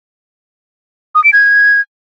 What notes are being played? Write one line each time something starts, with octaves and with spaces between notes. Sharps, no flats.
D#6
D7
G#6